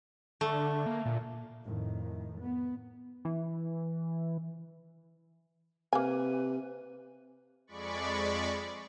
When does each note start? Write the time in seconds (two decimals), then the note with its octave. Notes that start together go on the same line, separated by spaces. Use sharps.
0.41 D3 A3
0.86 A#3
1.05 A#2
1.64 F2 A2 D#3
2.41 B3
3.25 E3
5.93 C3 A#3 B4 G#5
7.67 F2 G#3 D5 B5 C#6